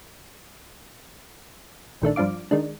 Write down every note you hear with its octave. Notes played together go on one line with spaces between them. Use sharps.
A#1 D#3 A3 D4
G2 F3 D4 F5 D6
D#3 G#3 D4